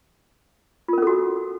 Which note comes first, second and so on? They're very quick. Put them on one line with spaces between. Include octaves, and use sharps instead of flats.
F4 A#4 C#4 A4 F#4